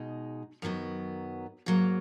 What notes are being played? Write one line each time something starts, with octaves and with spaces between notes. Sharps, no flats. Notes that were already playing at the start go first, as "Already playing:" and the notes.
Already playing: B2 G#3 D#4
F#2 D#3 F#3 B3
G#2 F#3 A#3